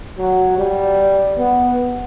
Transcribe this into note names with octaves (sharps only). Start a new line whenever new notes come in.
F#3
G3
B3